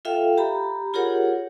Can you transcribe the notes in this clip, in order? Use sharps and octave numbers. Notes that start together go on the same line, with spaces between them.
F4 A4 E5 F5 G5
G4 A#5 B5
F4 G4 G#4 A#4 C#5 F#5